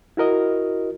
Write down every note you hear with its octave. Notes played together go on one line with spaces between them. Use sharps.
E4 F#4 A#4 D#5